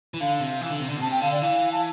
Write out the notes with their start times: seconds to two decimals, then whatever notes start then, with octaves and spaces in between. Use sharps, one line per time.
0.14 E3
0.21 D3 F5
0.40 C3
0.61 E3
0.70 D3
0.80 C3
0.89 D3
0.97 B2
1.01 C3 A5
1.11 G5
1.21 D3 F5
1.32 D5
1.42 E3 F5
1.72 A5